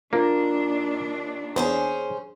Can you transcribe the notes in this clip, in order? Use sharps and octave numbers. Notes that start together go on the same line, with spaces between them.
D#2 A#3 D4 F4 A#4
E2 C#4 G#4 C5